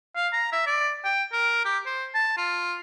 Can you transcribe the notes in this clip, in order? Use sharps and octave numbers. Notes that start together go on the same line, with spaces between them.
F5
A#5
E5
D5
G5
A#4
G4
C5
A5
F4